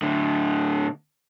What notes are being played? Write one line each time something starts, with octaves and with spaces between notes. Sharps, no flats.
A2 D3